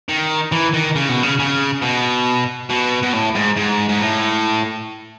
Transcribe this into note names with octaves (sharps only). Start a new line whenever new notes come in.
D#3
E3
D#3
C#3
B2
C#3
C#3
B2
B2
B2
A2
G#2
G#2
G#2
A2